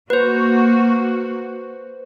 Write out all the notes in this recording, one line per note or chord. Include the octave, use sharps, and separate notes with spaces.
A#3 F#4 B4 C5